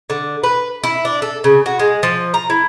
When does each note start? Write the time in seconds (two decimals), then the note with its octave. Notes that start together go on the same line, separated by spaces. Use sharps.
0.10 D3
0.43 B4
0.83 E4
1.05 D4
1.22 A4
1.44 C#3
1.66 F#4
1.79 G#3
2.03 F3
2.34 A#5
2.50 E4